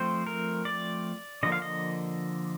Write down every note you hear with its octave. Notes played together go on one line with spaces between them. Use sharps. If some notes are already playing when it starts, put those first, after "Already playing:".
Already playing: F3 A3 C4 C5
A#4
D5
D3 F3 A#3 D#5
F5
D#5